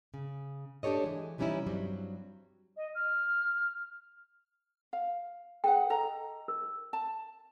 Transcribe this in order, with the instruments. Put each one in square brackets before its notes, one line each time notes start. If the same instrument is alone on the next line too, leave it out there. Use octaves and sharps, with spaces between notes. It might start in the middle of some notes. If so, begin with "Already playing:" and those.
[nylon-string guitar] C#3
D4 G4 A4 C#5 D#5
E3 G#3
C3 E3 G3 C#4 D#4 E4
G2 F#3 G3 C4
[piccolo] D#5
F6
[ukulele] F5
[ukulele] G#4 B4 F#5 [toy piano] G5
[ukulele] A4 D#5 A#5
[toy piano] A#4
[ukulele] A5